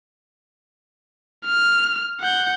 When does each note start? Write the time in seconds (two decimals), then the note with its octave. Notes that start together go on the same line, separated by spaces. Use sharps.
1.46 F6
2.21 F#5 G6